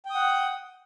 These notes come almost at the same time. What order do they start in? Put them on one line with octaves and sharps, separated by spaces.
G5 D#6 F#5